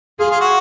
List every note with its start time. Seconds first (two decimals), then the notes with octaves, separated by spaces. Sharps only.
0.19 F4 G#4
0.30 F4
0.40 F#4